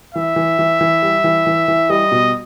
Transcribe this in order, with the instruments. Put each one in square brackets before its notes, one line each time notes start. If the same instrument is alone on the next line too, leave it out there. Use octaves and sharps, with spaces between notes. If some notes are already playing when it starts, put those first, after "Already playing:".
[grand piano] E3 [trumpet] E5
[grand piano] E3
E3
E3
G3
E3
E3
E3
[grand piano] G3 [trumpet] D#5
[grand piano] B2